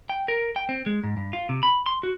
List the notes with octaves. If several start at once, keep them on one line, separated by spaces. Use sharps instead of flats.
G5
A#4
G5
C4
G#3
G#2
G2
F4
C3
B5
C6
F#4